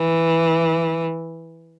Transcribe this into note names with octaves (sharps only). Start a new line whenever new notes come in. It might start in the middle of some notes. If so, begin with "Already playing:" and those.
Already playing: E3